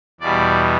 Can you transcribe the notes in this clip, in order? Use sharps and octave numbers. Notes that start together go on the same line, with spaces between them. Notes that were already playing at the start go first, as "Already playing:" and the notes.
E2 B2 G3 D5